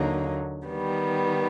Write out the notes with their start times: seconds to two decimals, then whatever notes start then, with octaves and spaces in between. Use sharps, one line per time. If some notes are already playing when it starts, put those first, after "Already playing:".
Already playing: D#2 D3 F#3 A#3 D#4
0.67 D#3 G3 B3